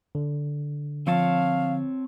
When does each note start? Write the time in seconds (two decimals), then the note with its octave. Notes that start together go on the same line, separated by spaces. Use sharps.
0.15 D3
1.07 F3 C4 C#5 F5 A5